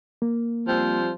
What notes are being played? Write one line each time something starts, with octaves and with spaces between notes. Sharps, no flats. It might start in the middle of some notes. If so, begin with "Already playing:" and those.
A#3
F3 G3 C4